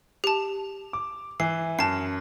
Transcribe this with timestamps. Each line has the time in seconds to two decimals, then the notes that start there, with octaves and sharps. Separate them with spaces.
0.24 G4 A5
0.93 D6
1.40 E3 C7
1.79 F#2 A5 C7